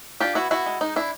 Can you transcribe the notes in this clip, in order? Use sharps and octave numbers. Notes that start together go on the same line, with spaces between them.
D4 F4 G4
B3 E4 F#4
B3 E4 F#4
G#3
G#3 D#4
D4 E4